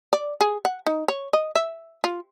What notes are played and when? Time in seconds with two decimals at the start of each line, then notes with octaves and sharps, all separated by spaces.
0.13 D5
0.41 G#4
0.65 F#5
0.86 D#4
1.08 C#5
1.33 D#5
1.55 E5
2.04 F4